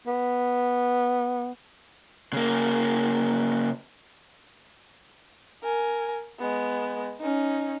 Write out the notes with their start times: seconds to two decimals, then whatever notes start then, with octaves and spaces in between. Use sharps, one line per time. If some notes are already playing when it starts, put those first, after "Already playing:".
0.06 B3
2.33 C#3 A#3
5.63 A#4 G#5
6.39 G#3 B3
7.20 C#4 D#4